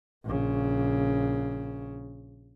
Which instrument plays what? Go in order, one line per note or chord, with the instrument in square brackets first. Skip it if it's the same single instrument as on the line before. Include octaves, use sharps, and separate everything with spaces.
[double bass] A#1 C#3